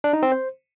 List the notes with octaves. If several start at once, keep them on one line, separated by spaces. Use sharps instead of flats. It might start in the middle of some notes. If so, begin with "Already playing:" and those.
D4
D#4
C4
C5